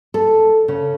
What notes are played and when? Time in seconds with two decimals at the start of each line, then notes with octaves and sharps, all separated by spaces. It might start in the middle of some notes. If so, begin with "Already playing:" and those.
0.14 A4
0.68 C#3